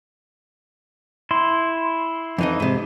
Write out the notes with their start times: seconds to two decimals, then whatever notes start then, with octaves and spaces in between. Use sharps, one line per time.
1.31 E4 C6
2.38 F2 E3 D#4
2.60 G#2 C3